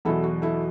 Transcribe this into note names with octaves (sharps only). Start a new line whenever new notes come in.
E2 B2 F#3 E4 A4
F#4
E4 A4